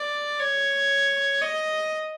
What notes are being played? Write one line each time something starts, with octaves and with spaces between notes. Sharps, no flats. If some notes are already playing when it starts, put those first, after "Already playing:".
Already playing: D5
C#5
D#5